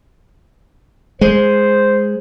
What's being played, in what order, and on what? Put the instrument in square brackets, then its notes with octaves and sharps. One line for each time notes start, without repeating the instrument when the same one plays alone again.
[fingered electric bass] G#3 [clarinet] C5